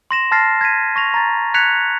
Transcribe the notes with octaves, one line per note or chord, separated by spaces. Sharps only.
C6 A#6 E7
A5 C6 F6 A6 A#6 C7
G#6 A#6 B6 D#7
C#6 A#6 F7
A#5 A6
F#6 G#6 B6 C#7 F7